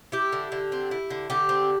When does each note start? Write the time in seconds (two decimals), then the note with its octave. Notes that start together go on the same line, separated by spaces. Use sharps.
0.12 E4 G4
0.32 D3
0.52 D3
0.72 C4
0.91 E4
1.10 D3
1.30 D3 G4
1.49 C4